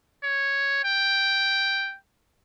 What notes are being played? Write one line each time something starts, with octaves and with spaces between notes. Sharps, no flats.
C#5
G5